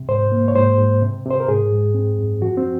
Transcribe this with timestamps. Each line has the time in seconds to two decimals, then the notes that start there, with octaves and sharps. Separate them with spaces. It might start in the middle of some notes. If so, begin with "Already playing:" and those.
Already playing: C3
0.09 G#2 C5
0.32 A#3
0.48 C#5
0.55 G#2 C5
0.78 G#2
1.02 C3
1.26 C3 C5
1.40 A#4
1.48 G#2 G#4
1.72 G#2
1.94 C4
2.19 F#2
2.42 F3 F#4
2.57 C4